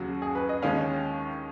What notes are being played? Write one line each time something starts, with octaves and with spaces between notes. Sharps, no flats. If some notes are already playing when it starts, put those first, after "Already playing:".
Already playing: D#2 C#3 F#3 F#4
G#4
B4
D#5
D#2 D#3 G#3 C#4 F5